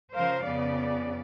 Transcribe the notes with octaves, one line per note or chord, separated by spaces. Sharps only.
C#3 F3 A#4 C5 F5
F2 C#3 B3 D5